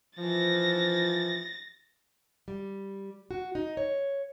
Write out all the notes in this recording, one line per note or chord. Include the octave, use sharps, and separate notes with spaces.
E3 F3 A6 A#6
G3
F#4
D#4
C#5